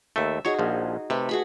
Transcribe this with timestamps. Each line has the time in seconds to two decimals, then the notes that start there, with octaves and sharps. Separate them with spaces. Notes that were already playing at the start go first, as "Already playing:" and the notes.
0.16 D#2 A3 E5
0.45 D#4 F#4 G#4 C#5
0.59 A#1 F3
1.10 C3 A3 B4
1.29 F#4 G#4 B5